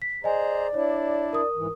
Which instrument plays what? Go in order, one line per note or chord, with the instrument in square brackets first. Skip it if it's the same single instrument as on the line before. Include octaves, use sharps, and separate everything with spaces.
[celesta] B6
[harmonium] G#4 C5 A#5 [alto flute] D5 [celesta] D#5 G#5
[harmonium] D4 E4 [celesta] C#5
[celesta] A#4 D#6
[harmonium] G#2 E3